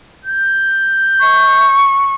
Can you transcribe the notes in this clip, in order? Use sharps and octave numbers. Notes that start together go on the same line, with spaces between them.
G6
C#6